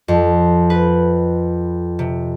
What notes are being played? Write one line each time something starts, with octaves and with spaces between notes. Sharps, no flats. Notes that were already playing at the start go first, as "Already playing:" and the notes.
F2
B4
C3